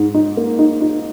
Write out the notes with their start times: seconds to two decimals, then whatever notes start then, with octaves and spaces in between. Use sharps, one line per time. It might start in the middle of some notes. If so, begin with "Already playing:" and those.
Already playing: G#2
0.14 D#4
0.37 A#3
0.59 D#4
0.81 D#4